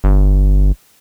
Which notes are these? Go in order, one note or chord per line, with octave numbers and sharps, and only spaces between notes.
G1